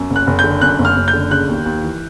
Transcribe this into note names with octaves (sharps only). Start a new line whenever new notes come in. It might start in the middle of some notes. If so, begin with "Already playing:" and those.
Already playing: F#2
F#1
F#6
F#1
G6
D3
F#2 F#6
F#1
F6
F#1
G6
D3
C#3 F#6
D#2
D#2
E3